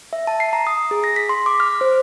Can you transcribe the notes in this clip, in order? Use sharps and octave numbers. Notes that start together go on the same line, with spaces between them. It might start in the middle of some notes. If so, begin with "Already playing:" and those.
E5
A5
C7
A#5
D#6
G#4
A#6
B6
C6
D6
F6
C5